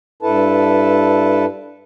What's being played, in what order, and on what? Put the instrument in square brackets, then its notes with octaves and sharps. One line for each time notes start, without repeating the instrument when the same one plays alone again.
[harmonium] G2 E4 A4 B4 A5